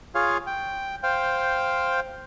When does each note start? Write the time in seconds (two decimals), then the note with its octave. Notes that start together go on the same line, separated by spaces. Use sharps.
0.15 F4 G#4 C#5 F5
0.47 G5
1.03 C5 F5 G5